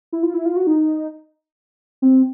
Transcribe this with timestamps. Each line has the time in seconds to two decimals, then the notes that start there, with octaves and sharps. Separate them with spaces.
0.12 E4
0.23 F4
0.34 E4
0.46 F4
0.56 F#4
0.67 D#4
2.02 C4